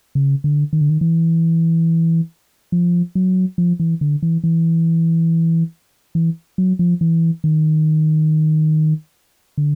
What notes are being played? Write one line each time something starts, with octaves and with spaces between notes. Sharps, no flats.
C#3
D3
D#3
D3
D#3
E3
F3
F#3
F3
E3
D3
E3
E3
E3
F#3
F3
E3
D#3
D3